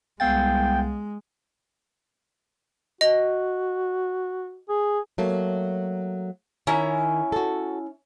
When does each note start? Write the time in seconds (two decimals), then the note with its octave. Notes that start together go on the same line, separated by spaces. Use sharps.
0.20 C2 G#3 B3 F5 G5 A6
3.01 F#4 D#5
4.69 G#4
5.18 F#3 A3 A#3
6.67 D#3 C#4 E4 A#5
7.32 F#4 A4